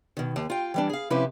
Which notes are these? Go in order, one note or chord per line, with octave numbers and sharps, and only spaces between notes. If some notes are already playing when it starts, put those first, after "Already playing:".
B2 D#3
D#2
F4 G5
E3 G3 D4
G#4 F5
C3 F3 C#4 E4 G4 B4